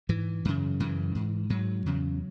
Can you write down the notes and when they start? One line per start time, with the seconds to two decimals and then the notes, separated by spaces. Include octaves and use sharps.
0.09 G#2 E3
0.45 F#2 C#3
0.80 F#2 C#3 E3
1.15 G#2
1.50 G#2 F#3
1.86 E2 C#3